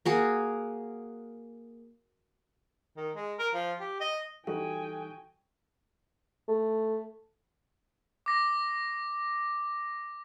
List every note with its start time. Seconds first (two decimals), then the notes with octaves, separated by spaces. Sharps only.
0.05 A#3 F#4 G#4
2.96 D#3
3.15 G#3
3.39 A#4
3.54 F3
3.80 G4
4.00 D#5
4.47 E3 G3 D#4 F#4 A4 G5 G#5
6.48 A3
8.26 D6 A#6